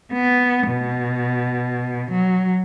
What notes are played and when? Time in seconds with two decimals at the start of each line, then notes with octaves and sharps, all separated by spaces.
0.12 B3
0.68 B2
2.11 F#3